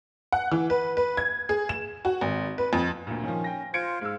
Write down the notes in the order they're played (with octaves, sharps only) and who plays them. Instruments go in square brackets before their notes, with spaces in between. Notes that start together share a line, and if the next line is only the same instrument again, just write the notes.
[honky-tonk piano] F#5
E3
B4
B4
G#6
G#4
E7
F#4
G#1
B4
F2
[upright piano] D2 A#2
[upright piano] D#3 F3 [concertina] C#4
[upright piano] G5 A#6
[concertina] F4 C5 [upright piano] G#6 C#7 D7
[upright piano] G#2 E6 [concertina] F5